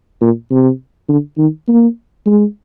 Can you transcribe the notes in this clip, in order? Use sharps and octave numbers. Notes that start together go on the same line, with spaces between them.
A#2
C3
D3
D#3
A#3
G#3